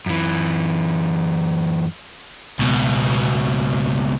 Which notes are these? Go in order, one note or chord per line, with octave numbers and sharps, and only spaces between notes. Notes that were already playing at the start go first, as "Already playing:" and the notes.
F#2 E3
C#2 B2